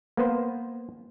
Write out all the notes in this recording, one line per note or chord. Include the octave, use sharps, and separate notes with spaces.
A#3 B3 B4 C5